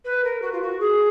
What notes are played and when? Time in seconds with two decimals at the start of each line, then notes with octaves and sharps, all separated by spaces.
0.05 B4
0.24 A#4
0.42 F#4
0.52 F4
0.62 F#4
0.80 G#4